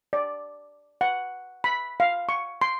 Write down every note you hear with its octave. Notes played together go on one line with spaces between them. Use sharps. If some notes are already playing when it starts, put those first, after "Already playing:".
D5
F#5
B5
F5
C#6
C6